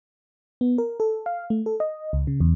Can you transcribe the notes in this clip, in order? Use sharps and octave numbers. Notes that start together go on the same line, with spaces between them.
B3
A#4
A4
F5
A3
A4
D#5
C#2
C#3
E2